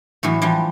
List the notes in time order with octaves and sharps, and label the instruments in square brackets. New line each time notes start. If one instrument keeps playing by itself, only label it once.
[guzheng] A2 E3 F#3
E3 F3 G3